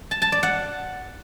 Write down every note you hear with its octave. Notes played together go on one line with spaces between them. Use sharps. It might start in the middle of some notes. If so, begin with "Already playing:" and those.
A5
A5
D5
F#5